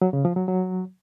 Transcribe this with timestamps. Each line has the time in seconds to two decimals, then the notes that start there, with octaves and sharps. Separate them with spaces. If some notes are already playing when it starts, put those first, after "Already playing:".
0.02 F#3
0.13 C#3
0.25 F3
0.36 F#3
0.48 F#3